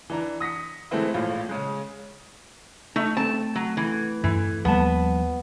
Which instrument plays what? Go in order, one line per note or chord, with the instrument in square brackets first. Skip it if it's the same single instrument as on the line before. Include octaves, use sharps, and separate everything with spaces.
[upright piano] E3 D4 A#5
D#6 A#6 B6 C#7
E3 G#3 A3 C4 E4
A#1 A2 F4
C#3 G#3
[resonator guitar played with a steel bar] A3 [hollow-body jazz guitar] D#4
[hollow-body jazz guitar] A3 C4 [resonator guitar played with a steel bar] A5
[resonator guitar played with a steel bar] F#3
E3
[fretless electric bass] G2 [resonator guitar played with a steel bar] E3
[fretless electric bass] D#2 G3 A#3 [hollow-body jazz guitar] F3 A5 [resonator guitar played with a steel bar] B3